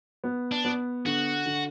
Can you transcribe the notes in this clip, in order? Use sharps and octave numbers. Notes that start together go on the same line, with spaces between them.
B3
D4
B3
D3 F#4
D3